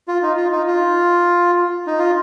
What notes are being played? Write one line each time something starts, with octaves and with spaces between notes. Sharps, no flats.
F4
D#4
F4
D#4
F4
D#4
F4